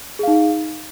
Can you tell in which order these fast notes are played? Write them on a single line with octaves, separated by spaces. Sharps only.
G#4 F5 D#4